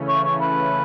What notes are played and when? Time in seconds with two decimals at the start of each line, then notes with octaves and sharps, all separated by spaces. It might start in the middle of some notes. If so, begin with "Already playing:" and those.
Already playing: C#3 E3 A3 C#4
0.08 C#5
0.24 C#5
0.41 B4